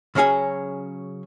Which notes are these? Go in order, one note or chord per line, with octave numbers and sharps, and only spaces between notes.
C#3 F#3 C#4 G#4 G#5